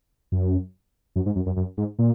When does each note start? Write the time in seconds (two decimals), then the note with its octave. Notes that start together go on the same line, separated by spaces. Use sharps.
0.32 F#2
1.16 F#2
1.26 G#2
1.36 F#2
1.46 F#2
1.56 F#2
1.78 G#2
1.99 A#2